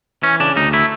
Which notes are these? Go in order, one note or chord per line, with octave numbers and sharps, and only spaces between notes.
E3 C#4
C#3 D4
D2 D#4
A3 E4